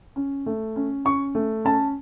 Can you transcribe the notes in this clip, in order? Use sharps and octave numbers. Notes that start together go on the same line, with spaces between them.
C#4
A3
C#4
C#4 C#6
A3
C#4 A5